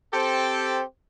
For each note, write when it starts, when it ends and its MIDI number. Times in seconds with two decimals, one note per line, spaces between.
0.14 0.81 60
0.14 0.81 67
0.14 0.81 69